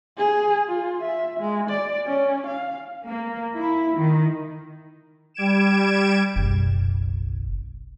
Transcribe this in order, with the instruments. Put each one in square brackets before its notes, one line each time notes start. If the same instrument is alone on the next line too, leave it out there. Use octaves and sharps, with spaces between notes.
[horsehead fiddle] G#4
F4
E5
G#3
D5
C#4
F5
[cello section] A#3
E4
D#3
[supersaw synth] G3 G#6 D7 E7
[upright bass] F#1 B1